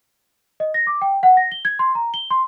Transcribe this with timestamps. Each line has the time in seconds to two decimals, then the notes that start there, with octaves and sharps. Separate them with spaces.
0.60 D#5
0.74 A#6
0.87 D6
1.02 G5
1.23 F#5
1.37 A#6
1.52 G7
1.65 G#6
1.79 C6
1.95 A#5
2.14 G7
2.30 C6